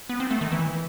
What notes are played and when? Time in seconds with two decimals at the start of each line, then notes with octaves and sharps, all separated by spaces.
0.09 B3
0.20 C4
0.31 A3
0.41 D#3
0.52 E3